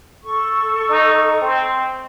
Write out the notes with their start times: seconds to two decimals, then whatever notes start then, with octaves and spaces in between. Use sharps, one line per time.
0.22 A4 C#6
0.90 D#4
1.41 C4